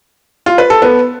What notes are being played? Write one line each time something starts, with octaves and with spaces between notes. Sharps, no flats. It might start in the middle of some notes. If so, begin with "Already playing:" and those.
F4
B4
A4
B3